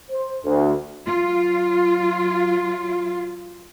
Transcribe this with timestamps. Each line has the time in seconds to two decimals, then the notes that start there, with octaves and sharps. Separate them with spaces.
0.11 C5
0.45 D2
1.05 F#3 F4